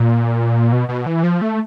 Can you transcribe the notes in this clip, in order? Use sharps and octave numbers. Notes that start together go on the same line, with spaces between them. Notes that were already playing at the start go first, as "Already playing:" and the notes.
Already playing: A#2
B2
B2
E3
F3
A3